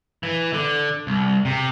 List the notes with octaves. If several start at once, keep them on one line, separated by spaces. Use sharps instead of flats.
E3
D3
C2
C3